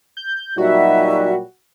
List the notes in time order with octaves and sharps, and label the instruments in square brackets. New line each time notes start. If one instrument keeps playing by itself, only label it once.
[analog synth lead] G6
[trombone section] A#2 F#3 G3 [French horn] D#4 [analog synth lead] F#4 [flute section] E5